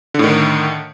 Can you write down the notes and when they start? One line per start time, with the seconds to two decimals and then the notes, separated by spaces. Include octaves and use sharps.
0.14 D3
0.19 A2
0.24 D#3